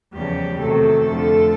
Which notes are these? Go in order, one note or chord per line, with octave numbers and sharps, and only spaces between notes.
E2 C#3 F3 G3 G4
E2 C3 D#3 F#3 A3 A4
F2 D3 F3